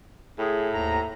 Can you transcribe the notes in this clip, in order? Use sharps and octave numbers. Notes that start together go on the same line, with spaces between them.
A2 G#4
D#2 G#2 A#5